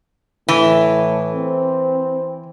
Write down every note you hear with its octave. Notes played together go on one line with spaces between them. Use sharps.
A2 E3
C4